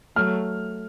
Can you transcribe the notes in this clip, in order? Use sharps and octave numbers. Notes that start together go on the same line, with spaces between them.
F#3 A3 F6